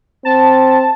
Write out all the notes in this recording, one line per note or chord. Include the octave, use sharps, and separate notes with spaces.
C4 A5